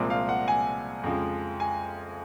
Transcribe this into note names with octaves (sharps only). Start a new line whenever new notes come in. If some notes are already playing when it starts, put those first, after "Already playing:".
Already playing: C2 A#2 F3 G#3 C4
F5
F#5
G#5
F2 C#3 F3 G#3
G#5